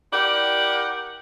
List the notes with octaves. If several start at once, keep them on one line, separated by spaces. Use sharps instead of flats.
E4 G4 A#4 D5 F#5